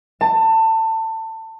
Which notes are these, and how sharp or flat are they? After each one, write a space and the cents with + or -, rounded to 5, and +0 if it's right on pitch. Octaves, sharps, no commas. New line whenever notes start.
A5 +25